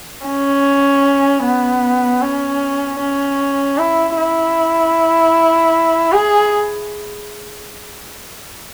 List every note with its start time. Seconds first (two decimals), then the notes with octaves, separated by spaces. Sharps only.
0.26 C#4
1.43 B3
2.22 C#4
3.00 C#4
3.78 E4
4.17 E4
6.12 G#4